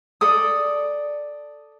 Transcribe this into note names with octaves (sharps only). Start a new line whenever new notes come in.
A4 D5 D#6